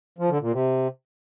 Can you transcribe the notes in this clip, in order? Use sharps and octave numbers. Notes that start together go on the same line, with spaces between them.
F3
D3
A#2
C3